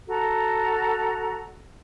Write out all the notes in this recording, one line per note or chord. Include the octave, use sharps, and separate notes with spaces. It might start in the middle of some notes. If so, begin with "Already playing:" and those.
F#4 A4 A#5